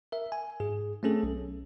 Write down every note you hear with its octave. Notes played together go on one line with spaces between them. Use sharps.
A#4 E5
G#5
G#2 G#4
A3 C4 C#4 G#4 A4
B1